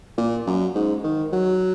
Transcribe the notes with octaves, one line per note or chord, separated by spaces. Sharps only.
A#2
F#2
G#2
D#3
F#3